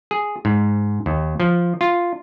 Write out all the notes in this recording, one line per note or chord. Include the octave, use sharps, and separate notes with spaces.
G#4
G#2
D#2
F3
F4